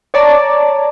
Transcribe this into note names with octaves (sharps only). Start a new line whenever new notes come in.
C#5 D5 A5 A#5